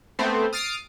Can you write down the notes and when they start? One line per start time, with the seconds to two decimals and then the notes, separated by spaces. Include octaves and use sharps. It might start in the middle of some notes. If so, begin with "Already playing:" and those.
0.19 A3 B3 C4 C5
0.53 D#6 F6 A6 C7 D7